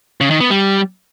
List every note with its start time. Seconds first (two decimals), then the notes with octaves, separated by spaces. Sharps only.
0.21 C#3
0.30 D#3
0.40 B3
0.50 G3